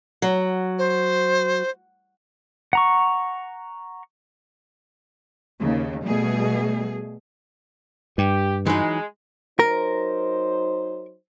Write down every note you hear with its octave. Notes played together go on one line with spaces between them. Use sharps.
F#3
C5
F#5 A#5 C#6
D#2 C#3
B2 G3 A3 G#4
G2 G4
E3 F#3 G#3 D#4
F#3 D#4 A#4 C5